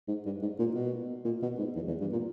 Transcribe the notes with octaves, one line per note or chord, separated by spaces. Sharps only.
G#2
G2
G#2
A#2
B2
A#2
B2
G#2
E2
E2
G2
A#2